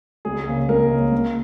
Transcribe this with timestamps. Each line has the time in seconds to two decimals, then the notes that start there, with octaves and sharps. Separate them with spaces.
0.25 C#2 G#4
0.47 C#3 A#3
0.69 C#2 A#4
0.91 C#3 A#3
1.12 C#2